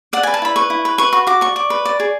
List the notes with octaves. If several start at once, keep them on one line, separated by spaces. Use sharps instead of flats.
D5 F#5
G#5
B4
A5
E4 B5
B4 C#6
E4
B4
B4 C#6
F#4 C#6
F#4 D6
D5 C#6
D5
B4
D5
G#4